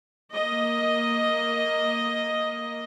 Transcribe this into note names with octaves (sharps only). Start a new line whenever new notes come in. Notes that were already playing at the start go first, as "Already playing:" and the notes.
A#3 D#5